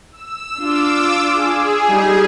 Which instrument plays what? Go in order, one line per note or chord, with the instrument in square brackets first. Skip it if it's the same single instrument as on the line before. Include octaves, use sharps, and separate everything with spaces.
[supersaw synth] E6
[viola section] D4 F4 [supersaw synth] D6 E6
[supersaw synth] G#4
[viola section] G3 D#4